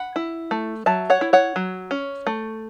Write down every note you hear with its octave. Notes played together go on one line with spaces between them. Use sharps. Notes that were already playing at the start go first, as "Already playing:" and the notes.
Already playing: F#5 B5
E4
A3
F#3 E5 A5
C#5 F#5
E4
C#5 F#5
F#3
C#4
A3